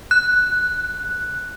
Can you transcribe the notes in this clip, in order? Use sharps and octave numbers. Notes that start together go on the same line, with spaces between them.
F#6